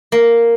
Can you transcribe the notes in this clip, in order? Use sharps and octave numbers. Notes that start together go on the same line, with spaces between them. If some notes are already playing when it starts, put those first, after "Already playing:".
A#3